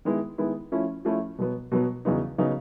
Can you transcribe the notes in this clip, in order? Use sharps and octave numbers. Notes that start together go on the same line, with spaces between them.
D#3 G#3 B3 E4
D#3 G#3 B3 E4
F3 A3 C#4 E4
F3 A3 C#4 E4
B2 F#3 B3
B2 F#3 B3
E2 C#3 F#3 B3 D#4
C#3 F#3 B3 D#4